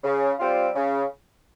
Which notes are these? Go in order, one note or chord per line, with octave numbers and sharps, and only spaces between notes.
C#3
G3 C4 F4
C#3